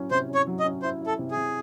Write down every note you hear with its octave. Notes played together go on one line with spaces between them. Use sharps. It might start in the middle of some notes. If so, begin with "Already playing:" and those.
Already playing: F#3 C#4 E4
C3 C5
C#4
C#5
F#3
D#5
C#4
E4 C5
E4
A4
C3
G#4
C3